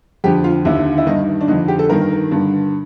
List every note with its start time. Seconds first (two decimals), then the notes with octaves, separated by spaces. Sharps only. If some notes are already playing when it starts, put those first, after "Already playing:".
0.24 F2 D3 G4
0.44 F4
0.65 D#2 D3 E4
0.97 E4
1.07 G2 D#3 D#4
1.41 D4
1.48 F2 D3 D#4
1.68 G4
1.79 A4
1.89 G2 D#3 A#4
2.31 G2 D3